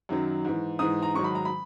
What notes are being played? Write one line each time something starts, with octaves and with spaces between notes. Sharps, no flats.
F#2 D#3 F#3
G#2 E3
G#2 E3 D#6
A#5
G#2 D#3 F#3 C#6
B5
A#5
B5